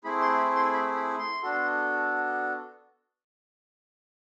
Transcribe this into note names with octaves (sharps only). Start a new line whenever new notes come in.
A3 C4 E4 G#4 B5
C6
B5
C6
B5
B5
C6
B3 D4 F#4 A4